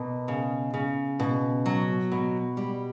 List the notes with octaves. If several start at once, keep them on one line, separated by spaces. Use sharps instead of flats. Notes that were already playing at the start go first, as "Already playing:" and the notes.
Already playing: B2 A#3
C#3
C#3
B2
F#3
B2
G3